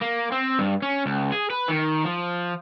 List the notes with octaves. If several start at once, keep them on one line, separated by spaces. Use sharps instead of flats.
A#3
C4
G2
C#4
C#2
G#4
B4
D#3
F3